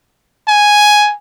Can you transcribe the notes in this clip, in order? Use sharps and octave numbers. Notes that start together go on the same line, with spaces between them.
G#5